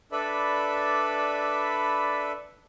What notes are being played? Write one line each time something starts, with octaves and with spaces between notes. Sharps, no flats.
D4 A4 B4 D5 E5 B5